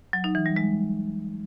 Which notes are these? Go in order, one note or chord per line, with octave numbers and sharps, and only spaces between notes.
F#3
D#4
E3
G3
G#3